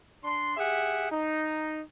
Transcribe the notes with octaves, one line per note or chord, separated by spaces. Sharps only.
D4 C6
G4 G#4 E5 F#5
D#4